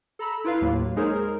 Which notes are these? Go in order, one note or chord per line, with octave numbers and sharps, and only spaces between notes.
A4 A#5 B5 E6
E4 F4 B4 F5
D#2 A2 F#3 A#3
G#3 D#4 G#4 A#4 C5 C#5
A#4